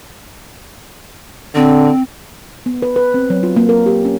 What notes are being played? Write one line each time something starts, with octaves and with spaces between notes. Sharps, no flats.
D3 C4
B3
B4
B4
C4
F#3
F4
A#3
A#4
G4
C#4